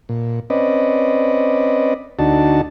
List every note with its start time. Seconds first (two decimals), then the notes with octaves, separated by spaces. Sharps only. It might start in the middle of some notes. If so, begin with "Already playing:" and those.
0.09 A#2
0.50 C4 C#4 B4 D5 D#5
2.19 D2 D4 D#4 F#4 A5